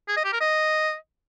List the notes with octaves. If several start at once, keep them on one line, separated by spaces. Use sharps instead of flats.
G#4
D#5
G4
A#4
D#5